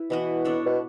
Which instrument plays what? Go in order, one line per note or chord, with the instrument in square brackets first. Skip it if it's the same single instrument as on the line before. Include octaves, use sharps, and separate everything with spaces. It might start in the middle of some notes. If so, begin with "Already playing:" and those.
Already playing: [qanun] E4 B4
[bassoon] B2 [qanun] E3 B3 F#4
[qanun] B3 D4 A4 C#5
[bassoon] B2